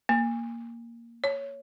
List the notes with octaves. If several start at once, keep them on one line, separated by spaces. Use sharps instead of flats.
A#3
C#5